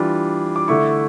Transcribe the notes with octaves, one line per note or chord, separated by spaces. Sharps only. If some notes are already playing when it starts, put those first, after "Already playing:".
Already playing: E3 G3 D4 F4
D6
D3 A3 E4 C#6